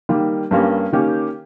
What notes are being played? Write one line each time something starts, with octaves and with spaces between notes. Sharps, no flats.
D#3 G3 A#3
G2 G3 A#3 C#4
D#3 A#3 C#4 G4